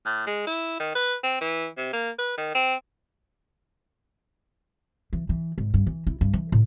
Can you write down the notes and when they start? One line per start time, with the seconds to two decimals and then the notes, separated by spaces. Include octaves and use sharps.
0.06 A2
0.27 G#3
0.47 E4
0.80 D#3
0.95 B4
1.23 C4
1.41 E3
1.77 C3
1.93 A#3
2.19 B4
2.38 D#3
2.55 C4
5.13 E3
5.29 E3
5.58 G#2
5.74 G2
5.87 E3
6.07 E4
6.21 G2
6.33 E3
6.52 A2